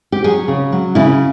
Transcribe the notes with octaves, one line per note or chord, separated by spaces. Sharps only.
G4
F#3 G#4
C#3
F#3
C#3 E4